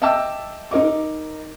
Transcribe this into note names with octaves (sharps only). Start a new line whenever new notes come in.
D#5 E5 G5 A5 D6 E6
D#4 A#4 D#5 D6